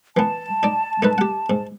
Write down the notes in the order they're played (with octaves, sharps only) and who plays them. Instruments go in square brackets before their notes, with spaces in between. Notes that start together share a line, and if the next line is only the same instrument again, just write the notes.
[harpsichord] E3 B3 [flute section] A5
[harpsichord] D#4 D5
A3 D#4 B4
G4 F#5
G#2